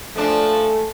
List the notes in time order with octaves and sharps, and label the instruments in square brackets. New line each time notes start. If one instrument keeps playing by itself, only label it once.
[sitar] F3 D4 [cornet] A3 [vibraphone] A4 G#5